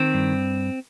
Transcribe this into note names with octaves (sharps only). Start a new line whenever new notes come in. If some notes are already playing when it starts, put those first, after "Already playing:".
Already playing: D#3 C4
G2